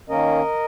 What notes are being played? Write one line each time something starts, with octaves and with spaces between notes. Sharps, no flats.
D#3 A#3 C#4 A#4 D#5